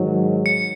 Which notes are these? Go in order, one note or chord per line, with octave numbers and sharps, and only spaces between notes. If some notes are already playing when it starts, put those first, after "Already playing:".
Already playing: G#2 D#3 F#3
C#7